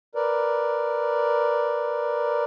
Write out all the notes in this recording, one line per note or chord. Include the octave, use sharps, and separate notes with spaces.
A#4 B4 D5